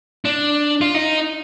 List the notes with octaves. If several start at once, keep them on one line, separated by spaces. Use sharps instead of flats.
D4
F4
D#4